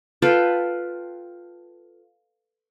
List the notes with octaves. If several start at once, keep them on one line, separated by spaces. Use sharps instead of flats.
F4 A4 B4 G5